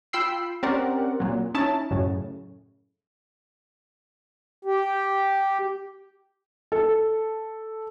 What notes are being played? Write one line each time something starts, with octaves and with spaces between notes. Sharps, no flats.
F4 G5 B5 E6 C7
C4 C#4 G4 A#4 D5 F#5
A#2 F#3
C#4 D#4 E4 A5
F#2 A2 C#3
G4
A4